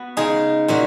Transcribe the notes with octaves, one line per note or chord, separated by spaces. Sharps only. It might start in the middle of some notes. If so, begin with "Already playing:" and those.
Already playing: B3 F#4
C#3 G#3 D#4 G#4
A#2 F#3 C#4 F#4